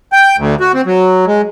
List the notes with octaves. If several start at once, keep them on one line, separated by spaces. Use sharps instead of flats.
G5
D2
F#4
C4
F#3
G#3